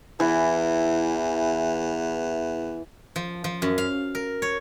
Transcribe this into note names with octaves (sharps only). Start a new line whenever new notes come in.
E2 E3
F3
F3
F#2
F5
A#4
C#5